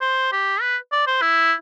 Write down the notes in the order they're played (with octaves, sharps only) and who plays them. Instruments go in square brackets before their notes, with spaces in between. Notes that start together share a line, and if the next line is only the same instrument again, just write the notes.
[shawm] C5
G4
B4
D5
C5
E4